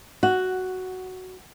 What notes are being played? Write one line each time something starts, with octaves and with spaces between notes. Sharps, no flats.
F#4